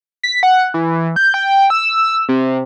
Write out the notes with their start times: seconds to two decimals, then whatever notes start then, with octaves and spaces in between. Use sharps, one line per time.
0.23 B6
0.43 F#5
0.74 E3
1.16 G6
1.34 G5
1.70 E6
2.29 C3